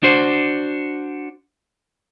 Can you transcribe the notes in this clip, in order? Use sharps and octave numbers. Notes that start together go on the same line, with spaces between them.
D4 F#4 C5